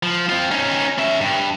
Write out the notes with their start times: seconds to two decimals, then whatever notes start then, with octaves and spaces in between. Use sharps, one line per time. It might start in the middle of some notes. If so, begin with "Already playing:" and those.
0.03 F3
0.29 C4 F4
0.51 C#4 D#4
0.98 C#4 E5
1.21 G2